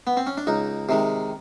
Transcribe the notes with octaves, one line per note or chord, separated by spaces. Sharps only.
B3
C4
C#4
D4
C#2 D#4
C3 D#3 G#3